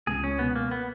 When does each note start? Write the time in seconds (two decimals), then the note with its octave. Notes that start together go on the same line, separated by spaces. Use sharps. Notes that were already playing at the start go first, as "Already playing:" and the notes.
0.07 C#2 G#4
0.24 C#4
0.39 B2 G#3 B3
0.56 A#3
0.71 B3